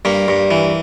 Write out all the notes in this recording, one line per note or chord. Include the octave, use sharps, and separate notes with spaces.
G2 A#3
G2
E3